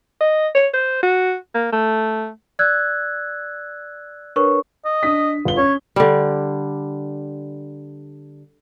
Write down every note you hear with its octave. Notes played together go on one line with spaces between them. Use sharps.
D#5
C#5
C5
F#4
A#3
A3
D5 E6 F#6 G#6
D4 A#4 B4 C#5 C#6
D#5
D4 D#6 B6
G1 F4 G7
C#4 C#5
D3 G3